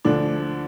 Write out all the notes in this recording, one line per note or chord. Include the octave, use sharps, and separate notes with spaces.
D2 D3 F3 D4